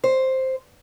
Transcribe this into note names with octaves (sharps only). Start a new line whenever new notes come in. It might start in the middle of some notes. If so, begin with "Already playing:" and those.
C5